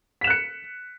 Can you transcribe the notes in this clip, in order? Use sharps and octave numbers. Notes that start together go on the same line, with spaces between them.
F#6 B6 C#7 E7